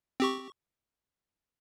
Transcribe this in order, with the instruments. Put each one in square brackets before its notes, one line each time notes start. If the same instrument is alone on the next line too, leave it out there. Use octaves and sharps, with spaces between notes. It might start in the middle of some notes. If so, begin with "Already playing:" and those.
[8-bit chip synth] C4 G4 C#6